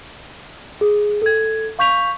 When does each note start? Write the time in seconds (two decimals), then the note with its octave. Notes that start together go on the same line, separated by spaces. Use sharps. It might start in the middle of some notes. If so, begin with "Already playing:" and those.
0.81 G#4
1.22 A4 G#6
1.79 F5 C#6 G6 B6 F7